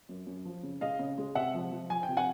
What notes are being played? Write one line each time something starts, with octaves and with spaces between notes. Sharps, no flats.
F#2
F#2
F3
C#3
G#3 D#5 F5
C#3
G#3
C3 E5 F#5
F3
F3
F3 G#5
G5
C3
F#5 G#5